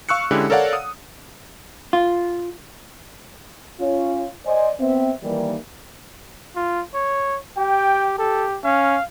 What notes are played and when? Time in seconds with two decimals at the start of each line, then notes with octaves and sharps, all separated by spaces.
0.09 F5 C#6 E6 F#6 C#7
0.31 D3 G#3 C#4 E4 G4
0.50 A4 A#4 C#5 D5 F5 F#5
0.73 D#6
1.93 F4
3.81 C#4 F4 C#5
4.46 C5 D5 D#5 G#5
4.80 B3 C4 E5
5.24 D#3 E3 G3 A#3
6.55 F4
6.94 C#5
7.58 G4 G5
8.18 G4 A4
8.64 C#4 F5